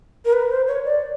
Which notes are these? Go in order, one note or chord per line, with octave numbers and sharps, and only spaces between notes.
A#4
B4
C5
C#5
D5